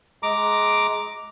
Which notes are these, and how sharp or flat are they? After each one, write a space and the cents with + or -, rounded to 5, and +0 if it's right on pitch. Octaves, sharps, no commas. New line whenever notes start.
G#3 +20 A#5 +0 D6 +0